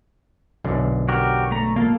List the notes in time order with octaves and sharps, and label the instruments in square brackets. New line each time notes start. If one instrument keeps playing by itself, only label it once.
[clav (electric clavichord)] B1 F#2 D3
[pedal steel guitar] F#4 G4 A#4
A3 A#5
A#3 F4 A4